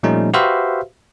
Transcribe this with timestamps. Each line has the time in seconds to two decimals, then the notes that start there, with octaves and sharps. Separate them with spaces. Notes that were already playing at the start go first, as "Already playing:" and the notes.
0.03 A#2 F3 G3 A3 C#4 D#4
0.34 F#4 G4 B4 C5 E5 F5